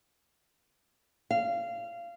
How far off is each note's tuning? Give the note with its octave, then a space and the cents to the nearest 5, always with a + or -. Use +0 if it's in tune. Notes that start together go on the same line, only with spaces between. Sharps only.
F5 -20